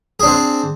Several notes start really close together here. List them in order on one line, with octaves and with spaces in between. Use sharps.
G#4 D4 C4